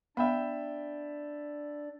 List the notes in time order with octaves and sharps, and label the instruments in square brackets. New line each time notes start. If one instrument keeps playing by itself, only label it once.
[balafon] B3 [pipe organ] D4 D5 [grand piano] E5 G5 B5